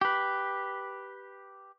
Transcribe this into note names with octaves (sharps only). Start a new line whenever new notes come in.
G4 B4